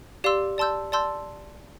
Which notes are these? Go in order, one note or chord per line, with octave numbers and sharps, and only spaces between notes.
G4 D5 F5 C6 E6
D5 A5 C6 E6 G6
D5 A5 C6 E6 G6